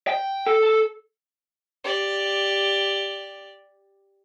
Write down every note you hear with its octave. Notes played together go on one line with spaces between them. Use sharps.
G5
A4
G4 D5